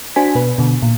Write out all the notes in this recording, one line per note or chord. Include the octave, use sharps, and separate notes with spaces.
D4 F#4 C5 G#5 B6
B2 B4
B2 D3
A#2